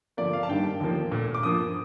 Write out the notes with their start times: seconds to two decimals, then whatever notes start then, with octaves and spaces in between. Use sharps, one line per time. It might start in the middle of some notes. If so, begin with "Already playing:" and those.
0.17 G2 D3 F3 A#3 D5
0.33 F5
0.43 A5
0.49 G2 D#3 G3 A#3 G5
0.80 D#2 D3 F3 A#3
1.12 A#2 A3
1.34 D6
1.43 G2 F3 A#3 D#6